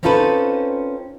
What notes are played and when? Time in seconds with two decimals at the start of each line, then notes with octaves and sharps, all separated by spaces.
0.03 C4 C#4 D#4 F4 A4 B4